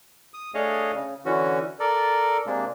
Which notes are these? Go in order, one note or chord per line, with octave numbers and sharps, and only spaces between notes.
D#6
A3 D4 G#4 C#5 D#5 F5
C#3
D3 E3 C#4 F#4
A4 A#4 D5
C3 G#3 A#3 D4